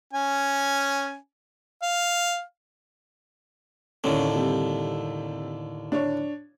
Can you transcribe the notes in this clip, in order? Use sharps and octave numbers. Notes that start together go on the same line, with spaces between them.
C#4 G#5
F5
D#2 A2 D3 C#4
C3 G3
D4 C#5